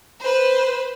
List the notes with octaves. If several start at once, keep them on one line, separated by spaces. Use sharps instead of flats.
B4 C5